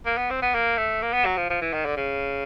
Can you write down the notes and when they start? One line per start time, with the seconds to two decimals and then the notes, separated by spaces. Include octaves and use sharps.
0.06 A#3
0.17 B3
0.30 C4
0.42 B3
0.54 A#3
0.77 A3
1.02 A#3
1.13 B3
1.25 F#3
1.37 F3
1.50 F3
1.61 E3
1.73 D#3
1.85 D3
1.97 C#3